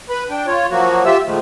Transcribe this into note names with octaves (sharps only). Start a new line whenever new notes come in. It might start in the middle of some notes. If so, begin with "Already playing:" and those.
B4 B5
D4 G5
F4 C#5
F3 F#3 A#3 F#4
F4 G4 E5 E6
A#2 D#3 F3 G#3 A3